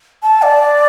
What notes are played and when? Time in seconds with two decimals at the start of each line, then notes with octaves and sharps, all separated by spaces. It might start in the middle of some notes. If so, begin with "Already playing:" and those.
0.23 A5
0.42 D5